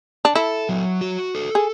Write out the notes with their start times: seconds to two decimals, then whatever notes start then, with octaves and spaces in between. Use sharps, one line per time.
0.25 D4
0.35 E4 A4
0.69 F#3
1.01 F#4
1.35 A4
1.55 G#4